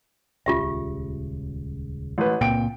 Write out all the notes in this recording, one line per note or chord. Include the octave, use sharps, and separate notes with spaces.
D#1 C#2 C#3 F4 G4 E5
A1 B4
C#2 A#2 C4 G5 D7